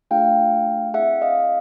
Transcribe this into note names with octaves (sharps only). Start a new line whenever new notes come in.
A3 D4 F4 G#4 F5 G5
C4 E4 G#4 E5 F#5
D#5 F5